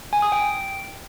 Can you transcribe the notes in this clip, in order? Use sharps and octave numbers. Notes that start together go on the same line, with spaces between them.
G#5
D#6
G5